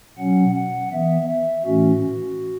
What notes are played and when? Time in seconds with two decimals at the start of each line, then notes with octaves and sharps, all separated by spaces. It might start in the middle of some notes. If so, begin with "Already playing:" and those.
0.18 B2 F#3 C#4 F#5
0.55 F#5
0.92 E3 B3 E5
1.29 E5
1.66 A2 E3 A3 C#4 F#4